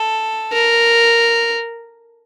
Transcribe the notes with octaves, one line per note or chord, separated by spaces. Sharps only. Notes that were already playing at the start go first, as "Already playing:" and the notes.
Already playing: A4
A#4